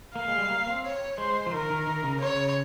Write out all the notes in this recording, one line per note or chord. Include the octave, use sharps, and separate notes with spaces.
A#3 F5
G#3
G3
A#3
C4
C#5
G#3 C5
F3
D#3 A#4
D#3
D#3
C#3
C#3 C#5